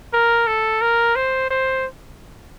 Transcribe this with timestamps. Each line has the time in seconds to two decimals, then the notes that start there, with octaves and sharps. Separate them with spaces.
0.13 A#4
0.47 A4
0.81 A#4
1.16 C5
1.50 C5